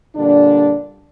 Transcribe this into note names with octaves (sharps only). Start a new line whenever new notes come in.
A#2 D3 G3 D4